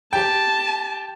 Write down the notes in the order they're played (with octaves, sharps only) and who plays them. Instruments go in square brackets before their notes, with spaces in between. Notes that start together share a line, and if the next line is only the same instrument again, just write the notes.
[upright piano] G4 G5 [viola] A5